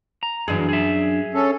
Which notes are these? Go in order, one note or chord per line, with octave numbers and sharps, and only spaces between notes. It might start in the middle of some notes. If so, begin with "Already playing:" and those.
A#5
F#2 E3 D4 G#4
G#4 E5
C#4 A4